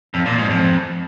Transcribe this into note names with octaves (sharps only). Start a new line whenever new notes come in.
F2
A#2
G#2
F2